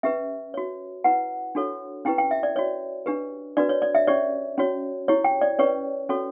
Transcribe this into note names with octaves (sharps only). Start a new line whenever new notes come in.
C#4 G4 B4 E5
F#4 C#5
E4 B4 F#5
D4 F#4 A4 C#5
C#4 E4 G4 B4 G5
G5
E5
D5
F#4 C#5
D4 G4 B4
D4 F#4 B4 D5
C#5
D5
E5
C#4 G4 C#5 D5
C#4 F#4 C#5
E4 G4 C#5
G5
D5
C#4 G4 B4 C#5
C#4 F#4 A4 C#5